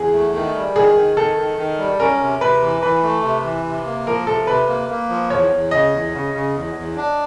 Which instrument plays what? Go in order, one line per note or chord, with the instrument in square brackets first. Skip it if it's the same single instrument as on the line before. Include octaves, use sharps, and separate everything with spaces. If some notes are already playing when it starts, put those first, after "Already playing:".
Already playing: [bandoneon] E2 [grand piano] G#4
[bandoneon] A3
D#3
G3
[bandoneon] D#3 [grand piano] G#4
[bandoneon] D#3
[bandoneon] D#3 [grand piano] A4
[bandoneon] D#3
D#3
G3
[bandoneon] C#4 [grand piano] A#4
[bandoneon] C3
[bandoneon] C3 [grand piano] B4
[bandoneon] E3
[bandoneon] E3 [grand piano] B4
[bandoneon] A3
C3
E3
C3
A#3
[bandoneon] F3 [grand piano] A#4
[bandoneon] C3 [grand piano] A4
[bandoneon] C3 [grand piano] B4
[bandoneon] A#3
A#3
F3
[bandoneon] E2 [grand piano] C#5
[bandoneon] E2
[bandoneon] C#3 [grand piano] D#5
[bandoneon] E2
C#3
C#3
E2
E2
D4